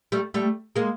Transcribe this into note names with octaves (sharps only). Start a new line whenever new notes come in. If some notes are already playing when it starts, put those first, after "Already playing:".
G3 A3
G3 A3
G#3 A#3